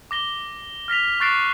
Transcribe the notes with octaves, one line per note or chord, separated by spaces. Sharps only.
D6 A#6 G7
F6 A#6 B6 F7
C#6 F#6 A6 C7 D7 E7